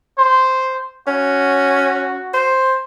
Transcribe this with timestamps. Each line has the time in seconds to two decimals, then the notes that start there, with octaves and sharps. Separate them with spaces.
0.19 C5
1.08 C#4 F#4
2.34 C5